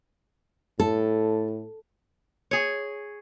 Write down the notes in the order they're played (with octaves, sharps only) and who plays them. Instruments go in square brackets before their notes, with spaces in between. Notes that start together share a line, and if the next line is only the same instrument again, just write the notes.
[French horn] A2 [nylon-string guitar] A4
[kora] G#4 C#5